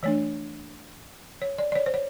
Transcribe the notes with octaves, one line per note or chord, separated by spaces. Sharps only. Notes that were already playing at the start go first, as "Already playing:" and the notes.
E3 A3 D4 C#5
C#5
D5
D5
C#5
C5
C#5